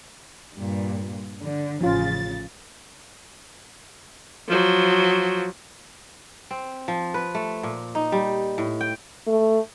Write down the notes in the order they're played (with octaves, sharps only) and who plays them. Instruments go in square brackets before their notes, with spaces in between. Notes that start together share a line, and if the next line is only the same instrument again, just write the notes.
[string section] G2 A#2
D3
[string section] A1 C#3 A6 [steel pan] F3 C#4 F4
[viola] F3 F#3
[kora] C4
F3
B4
A3
A#2
D#4
G3
A2
G5
[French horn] A3